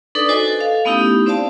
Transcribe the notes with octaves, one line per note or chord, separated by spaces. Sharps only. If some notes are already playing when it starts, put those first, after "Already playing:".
D4 D#4 A4 B4 D5
F#4 C5 D#5 G#5
A4
F5
A3 B3 C#4 D#4 E4 G4
C4 C5 D5 F5 A5